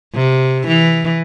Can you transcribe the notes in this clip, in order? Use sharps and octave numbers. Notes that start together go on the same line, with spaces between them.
C3
E3